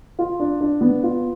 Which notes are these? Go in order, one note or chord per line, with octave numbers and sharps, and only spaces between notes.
F4
D4
D4
B3
F4